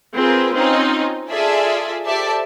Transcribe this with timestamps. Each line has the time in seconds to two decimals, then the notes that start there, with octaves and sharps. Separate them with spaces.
0.15 C4 F4 G#4 A#4 B4
0.54 C4 C#4 D#4 F4
1.30 F4 G#4 A4 D5 E5
2.06 G4 A4 C5 D5 E5 A5